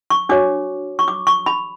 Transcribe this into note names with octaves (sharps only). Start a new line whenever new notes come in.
C#6
D4 F#4 C#5 D6
C#6
D6
C#6
B5